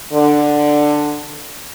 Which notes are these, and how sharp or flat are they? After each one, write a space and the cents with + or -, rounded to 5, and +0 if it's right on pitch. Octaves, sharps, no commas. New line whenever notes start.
D3 +10